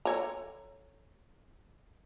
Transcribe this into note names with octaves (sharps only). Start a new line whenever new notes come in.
A4 C#5 A#5